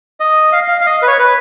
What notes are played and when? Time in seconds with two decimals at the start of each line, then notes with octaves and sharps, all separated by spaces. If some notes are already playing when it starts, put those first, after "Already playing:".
0.20 D#5
0.52 F5
0.68 F5
0.81 F5
0.86 D#5
1.02 B4
1.07 C#5
1.19 B4